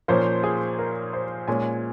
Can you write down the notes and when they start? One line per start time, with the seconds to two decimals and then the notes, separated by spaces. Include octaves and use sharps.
0.08 A#2 F3 A#3 C#4 C5
0.44 G#4
0.79 A#4
1.13 C5
1.48 A#2 G#3 C#4 G#5